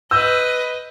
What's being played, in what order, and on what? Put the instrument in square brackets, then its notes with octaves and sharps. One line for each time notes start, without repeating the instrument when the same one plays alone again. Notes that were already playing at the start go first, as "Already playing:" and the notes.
[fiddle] B4 D#5 [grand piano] E6 G6